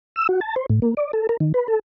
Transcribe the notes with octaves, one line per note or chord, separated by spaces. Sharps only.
E6
F#4
A5
C5
A2
A#3
D5
A4
A#4
D#3
B4
A4